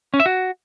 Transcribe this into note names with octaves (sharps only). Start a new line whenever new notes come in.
C#4
E5
F#4